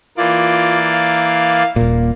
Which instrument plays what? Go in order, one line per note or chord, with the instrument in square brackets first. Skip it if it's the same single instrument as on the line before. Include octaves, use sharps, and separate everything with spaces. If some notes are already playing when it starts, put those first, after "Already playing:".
[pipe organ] E3 A#3 D5 [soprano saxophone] F4
[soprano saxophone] F5
[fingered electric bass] D#1 A#2 [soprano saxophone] A#3